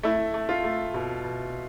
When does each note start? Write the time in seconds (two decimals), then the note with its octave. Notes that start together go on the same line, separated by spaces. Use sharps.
0.03 A3 E4
0.34 A3
0.49 F4
0.64 A3
0.94 B2
1.24 B2